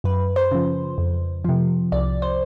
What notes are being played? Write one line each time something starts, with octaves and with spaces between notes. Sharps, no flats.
F#2 B4
C5
C#3 F3
F2
C3 F3
C2 D5
C5